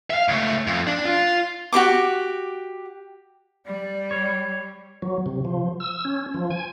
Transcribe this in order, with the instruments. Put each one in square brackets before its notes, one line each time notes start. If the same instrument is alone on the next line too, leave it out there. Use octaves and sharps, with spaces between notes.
[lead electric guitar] E5 F5
C#2 A3
F2
D4
F4
[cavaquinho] F#4 G4 C5 D6
[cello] G3 [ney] D5
[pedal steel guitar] C#5
[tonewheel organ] F#3
C3
F3
E6
C#4
F3
G#5